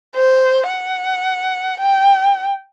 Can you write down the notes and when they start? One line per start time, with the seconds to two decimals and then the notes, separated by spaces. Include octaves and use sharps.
0.15 C5
0.68 F#5
1.80 G5